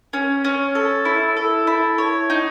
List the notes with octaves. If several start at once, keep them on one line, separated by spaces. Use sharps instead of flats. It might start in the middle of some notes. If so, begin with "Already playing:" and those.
C#4
C#4
A4
E4
A4
E4
C#5
D#4